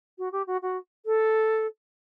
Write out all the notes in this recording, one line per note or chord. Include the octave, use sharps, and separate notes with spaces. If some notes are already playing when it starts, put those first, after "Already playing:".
F#4
G4
F#4
F#4
A4